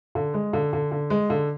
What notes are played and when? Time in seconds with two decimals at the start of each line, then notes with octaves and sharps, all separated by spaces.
0.15 D3
0.34 G#3
0.53 D3
0.73 D3
0.91 D3
1.10 G#3
1.30 D3